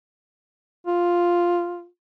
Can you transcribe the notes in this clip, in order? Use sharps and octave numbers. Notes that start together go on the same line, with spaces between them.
F4